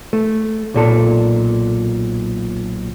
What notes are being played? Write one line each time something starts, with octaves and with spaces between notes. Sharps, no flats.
A3
B1 A#2 A4